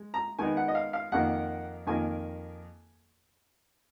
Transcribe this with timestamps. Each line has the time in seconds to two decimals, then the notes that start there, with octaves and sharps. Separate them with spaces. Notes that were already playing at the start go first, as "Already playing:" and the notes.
Already playing: G#3
0.14 A#5
0.39 D#3 G#3 B3 D#4 G#5
0.57 F#5
0.68 D#5
0.75 F5
0.93 F5
1.12 F2 D#3 A#3 F#5
1.87 F2 D#3 A#3 G#5